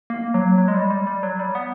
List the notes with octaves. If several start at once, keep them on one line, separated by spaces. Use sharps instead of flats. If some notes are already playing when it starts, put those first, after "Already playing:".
A#3
F#3
F#3
G#3
G3
G3
G3
F#3
G3
B3